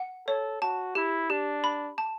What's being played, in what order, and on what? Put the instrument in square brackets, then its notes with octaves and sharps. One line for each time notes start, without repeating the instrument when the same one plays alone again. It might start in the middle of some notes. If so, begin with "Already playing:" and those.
Already playing: [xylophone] F#5
[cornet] A4 [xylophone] C#5
[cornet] F#4 [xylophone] A5
[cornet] E4 [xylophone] G4
[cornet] D4 [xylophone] G4
[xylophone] B5
A5